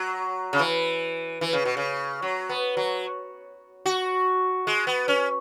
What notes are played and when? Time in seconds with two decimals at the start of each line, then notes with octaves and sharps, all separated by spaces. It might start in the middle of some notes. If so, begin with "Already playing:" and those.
Already playing: F#3
0.53 C#3
0.59 E3
1.41 E3
1.53 C#3
1.65 B2
1.77 C#3
2.22 F#3
2.49 B3
2.77 F#3
3.86 F#4
4.67 G#3
4.87 B3
5.08 C#4